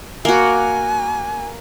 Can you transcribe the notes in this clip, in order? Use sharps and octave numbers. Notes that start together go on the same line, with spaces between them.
A#3 F#4 G#5